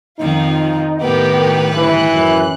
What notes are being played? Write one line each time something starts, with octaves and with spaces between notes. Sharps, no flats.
F2 D#3 F3 D#4 F4
A2 D#3 B3 G4 A#4 B4
G1 E3 F#6
F#2